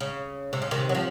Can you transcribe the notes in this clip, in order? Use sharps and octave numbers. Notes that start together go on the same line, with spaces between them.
C#3
C3
C#3
C3 D#3
F#3
F3